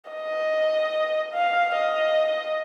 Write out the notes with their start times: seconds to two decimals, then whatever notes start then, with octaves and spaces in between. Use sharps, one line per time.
0.11 D#5
1.34 F5
1.75 D#5